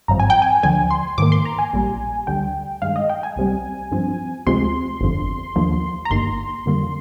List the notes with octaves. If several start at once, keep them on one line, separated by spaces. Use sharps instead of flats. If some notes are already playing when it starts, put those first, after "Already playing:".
G#1 G2 F3 C4 A#5
G#5
G5
G#5
D2 D3 F3 G#5
C6
G#2 D#3 A#3 D6
C6
A#5
G#5
A#1 A#2 G3
D2 D3 G3 G5
G2 D#3 G#3 F5
D#5
G5
G#5
C2 C3 G3
G2 F3 C4
D2 C3 F3 G#3 C4 C6
G1 F2 D3
D#2 D3 F3 A#3
A#5
G1 G2 D#3 A#3 C6
F2 D3 G3 A#3